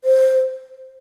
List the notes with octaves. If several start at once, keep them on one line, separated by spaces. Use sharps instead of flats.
C5